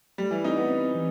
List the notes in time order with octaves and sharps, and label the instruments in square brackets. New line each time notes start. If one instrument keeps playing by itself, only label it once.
[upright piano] G3 [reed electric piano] A3
[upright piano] E3
[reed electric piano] C4 [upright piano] D#4
[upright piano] B3
[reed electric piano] C4
E3